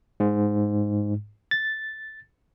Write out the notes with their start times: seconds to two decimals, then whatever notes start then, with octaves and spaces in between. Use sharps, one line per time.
0.20 G#2
1.51 A6